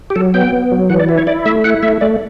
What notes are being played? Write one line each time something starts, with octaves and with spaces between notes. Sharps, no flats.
G4
F#3 A4
B3 G5
B3
F#3
E3 F#5
D5
E4
C#5
E4 D5
A3 E5
E4 F#5
A3 E5
A3 D5